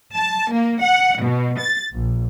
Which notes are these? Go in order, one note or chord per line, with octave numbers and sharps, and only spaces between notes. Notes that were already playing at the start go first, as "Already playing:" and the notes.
A5
A#3
F#5
B2
A6
A#1